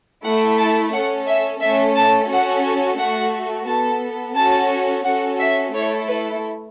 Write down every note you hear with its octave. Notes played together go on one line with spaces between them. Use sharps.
A3 E4 A4 F#5
A5
C#4 A4 F#5
E5
A3 C#4 A4 E5
A5
C#4 F#4 A4 F#5
A3 F#4 A4 F#5
B3 A4 A5
C#4 F#4 A4 A5
C#4 F#4 A4 F#5
E5
A3 E4 A4 C#5
B4